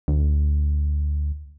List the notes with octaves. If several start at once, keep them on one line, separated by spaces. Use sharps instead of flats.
D2